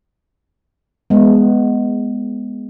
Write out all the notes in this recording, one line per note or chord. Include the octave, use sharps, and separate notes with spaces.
G#3 B3